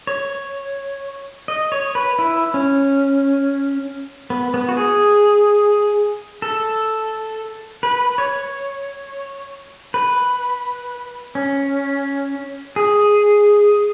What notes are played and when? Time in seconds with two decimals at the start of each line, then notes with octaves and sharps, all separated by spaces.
0.07 C#5
1.48 D#5
1.72 C#5
1.95 B4
2.19 E4
2.54 C#4
4.30 B3
4.54 B3
4.69 F#4
4.77 G#4
6.42 A4
7.83 B4
8.18 C#5
9.94 B4
11.35 C#4
12.76 G#4